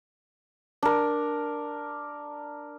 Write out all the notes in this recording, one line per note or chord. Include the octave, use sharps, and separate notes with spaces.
D4 A#4